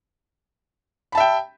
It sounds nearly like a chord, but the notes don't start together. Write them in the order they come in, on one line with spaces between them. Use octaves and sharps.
B5 A5 E5 G5